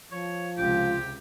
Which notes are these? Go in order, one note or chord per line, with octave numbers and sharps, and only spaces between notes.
F3 C#5
C#2 C3 F4 G4